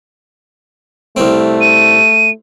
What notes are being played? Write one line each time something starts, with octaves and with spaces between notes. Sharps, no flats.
C2 A3 C4
D#7